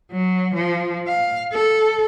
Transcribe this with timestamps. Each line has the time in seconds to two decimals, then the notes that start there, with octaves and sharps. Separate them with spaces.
0.12 F#3
0.55 F3
1.08 F5
1.53 A4